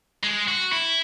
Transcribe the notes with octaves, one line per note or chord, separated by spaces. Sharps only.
G#3
F#4
E4